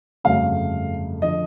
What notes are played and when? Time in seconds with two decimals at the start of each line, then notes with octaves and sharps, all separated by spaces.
0.24 G1 F2 C#3 F#3 A3 F5
1.22 D3 F3 D#5